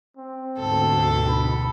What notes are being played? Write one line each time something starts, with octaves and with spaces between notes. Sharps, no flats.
C4
D2 G#2 B2 A4
B5